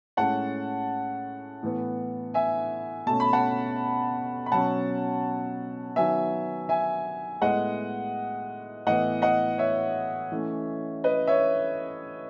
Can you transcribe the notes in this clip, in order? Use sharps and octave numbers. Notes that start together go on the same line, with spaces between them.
A2 G#3 C#4 F#5 A5
A2 E3 B3
E5 G#5
B2 A3 C#4 A5
B5
F#5 A5
B5
B2 F#3 C#4 F#5 A5
D#3 F#3 B3 E5 G#5
E5 G#5
A2 G#3 B3 D#5 F#5
A2 E3 B3 D#5 F#5
D#5 F#5
C#5 E5
E3 A3 C#4
B4 D#5
C#5 E5